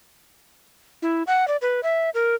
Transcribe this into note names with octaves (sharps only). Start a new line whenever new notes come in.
E4
F#5
D5
B4
E5
A#4